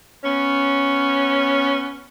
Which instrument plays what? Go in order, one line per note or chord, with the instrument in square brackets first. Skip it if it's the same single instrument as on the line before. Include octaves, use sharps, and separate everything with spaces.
[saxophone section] B3 C#4